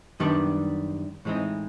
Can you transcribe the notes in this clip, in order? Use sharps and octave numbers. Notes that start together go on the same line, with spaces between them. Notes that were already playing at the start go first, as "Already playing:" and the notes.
F#2 D#3 G3 B3 D4
A2 E3 G#3 C4 D#4